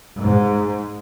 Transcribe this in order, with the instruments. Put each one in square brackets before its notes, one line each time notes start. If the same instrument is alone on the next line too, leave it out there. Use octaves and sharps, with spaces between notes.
[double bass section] G#2